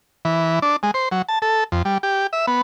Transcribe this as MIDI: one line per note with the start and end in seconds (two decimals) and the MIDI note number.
0.25 0.59 52
0.62 0.76 62
0.83 0.91 56
0.94 1.09 72
1.12 1.22 54
1.29 1.39 81
1.42 1.64 69
1.72 1.82 41
1.85 1.98 55
2.03 2.27 67
2.33 2.46 76
2.47 2.61 59